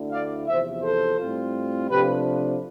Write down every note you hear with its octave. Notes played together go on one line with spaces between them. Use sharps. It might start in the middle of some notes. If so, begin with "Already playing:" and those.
Already playing: D2 D3 A3 E4
D5 F5
E2 C3 F3 C5 E5
A4 C5
A2 G3 C4 F4
C3 F3 A3 D4 F4 G4 B4